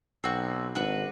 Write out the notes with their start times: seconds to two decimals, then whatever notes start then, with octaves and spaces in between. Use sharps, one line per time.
0.24 B1 C4 F#4
0.75 G#1 D4 F#4 B4